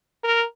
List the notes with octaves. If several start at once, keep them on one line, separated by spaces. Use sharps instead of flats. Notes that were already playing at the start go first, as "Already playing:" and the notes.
A#4